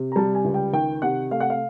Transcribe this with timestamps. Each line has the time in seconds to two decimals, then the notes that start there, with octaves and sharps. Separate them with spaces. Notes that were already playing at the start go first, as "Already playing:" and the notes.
Already playing: C3
0.12 A#5
0.16 G3 A5
0.35 G#5
0.45 C#2
0.54 G5
0.73 D#3 G5
1.02 C3 F#5
1.31 A3 F5
1.40 F#5
1.50 F5